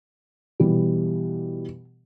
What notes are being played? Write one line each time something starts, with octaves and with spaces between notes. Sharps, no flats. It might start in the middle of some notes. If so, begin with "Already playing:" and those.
B2 E3 G3